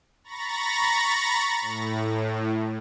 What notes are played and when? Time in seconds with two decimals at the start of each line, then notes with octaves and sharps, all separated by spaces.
0.24 A#5 B5 C#6 A6 A#6
1.61 A2